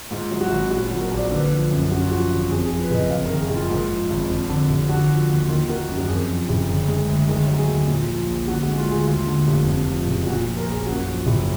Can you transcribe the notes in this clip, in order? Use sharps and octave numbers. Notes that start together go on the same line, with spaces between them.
G#2 F4
F#3
F#4
G#1
A#2 F#4
F#4
F#3
A#4
A#1
D5
D3 B4
F3
F#2
F#2 F#4
F4
F3 F#4
G#1
F2 G#4
G#4
F3
B4
F#1 D#5
F2 F5
A#4
D#3
G#4
F#1
F4
G#2
F3
G#1
F2
D3
F1
D3 F#4
F3
D#2
D#3 F4
A#3 F#4
F#2
F#4
F2 G#4
F3
F#1
D3
G#3
D2
D#3 G#4
F#3
G#4
D#2
A#2
F3
A#1
D3 F#4
F#4
G#3
F4
D2 G#4
D#2 F4
D3
F1
F2
F3
F#1
A#2 F#4
F3
A#4
A#1 G#4
F#2 F#4
F3
F#1